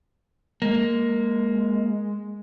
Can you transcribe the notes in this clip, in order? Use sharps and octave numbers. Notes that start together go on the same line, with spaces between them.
G#3 A#3